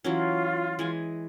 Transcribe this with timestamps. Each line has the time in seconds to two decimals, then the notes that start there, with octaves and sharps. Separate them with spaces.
0.04 E3 F#3 C#4 F4
0.79 E3 G#3 G#5